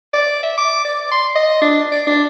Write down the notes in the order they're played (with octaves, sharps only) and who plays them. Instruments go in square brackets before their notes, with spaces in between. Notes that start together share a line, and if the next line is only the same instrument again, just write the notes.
[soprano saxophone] D5
E5
D6
D5
C6
D#5
D4
D5
D4